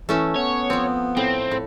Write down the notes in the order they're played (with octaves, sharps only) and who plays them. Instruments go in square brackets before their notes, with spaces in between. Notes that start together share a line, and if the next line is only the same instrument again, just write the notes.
[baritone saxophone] E3 [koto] A3 C#4 E5
[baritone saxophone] B3 [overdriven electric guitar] C#5
[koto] F3 C4
[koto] A2 [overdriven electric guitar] C4
[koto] A2